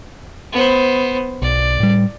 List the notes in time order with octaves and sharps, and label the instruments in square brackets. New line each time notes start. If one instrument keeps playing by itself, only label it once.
[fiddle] B3 C5
[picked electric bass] B1 [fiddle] D5
[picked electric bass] A2 G3